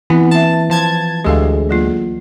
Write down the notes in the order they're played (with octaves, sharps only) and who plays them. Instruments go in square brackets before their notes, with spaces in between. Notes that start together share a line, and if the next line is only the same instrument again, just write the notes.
[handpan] E3 [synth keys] B3 [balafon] C4 E4
[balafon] A#3 E5 [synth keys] A5
[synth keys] F3 A5 G#6
[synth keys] D2 G#3 [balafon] G4 A4 F5
[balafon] F#3 A#3 F4